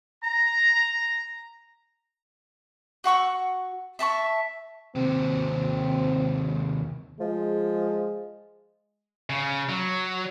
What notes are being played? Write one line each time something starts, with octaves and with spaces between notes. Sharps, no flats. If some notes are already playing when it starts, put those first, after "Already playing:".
A#5
F#4 F#5 C#6 E6
E5 A5 A#5 C#6
D#2 C3 C4
F3 G#3
C#3
F#3